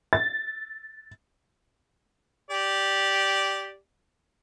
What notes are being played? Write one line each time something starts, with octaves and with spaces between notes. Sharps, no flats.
A6
G4 D5